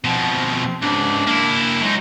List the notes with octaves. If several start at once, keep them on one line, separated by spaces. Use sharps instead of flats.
B2 F3 C4
C#2 G#2 D4
A#3 E4
F#3 G#3 D#4